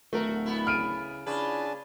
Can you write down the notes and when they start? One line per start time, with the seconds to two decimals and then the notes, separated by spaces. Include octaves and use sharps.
0.13 D1 A3 F#4 A#4
0.46 B3 E4
0.67 C#3 F6 D7 D#7
1.26 C#3 D4 F4 B4 G#5 A5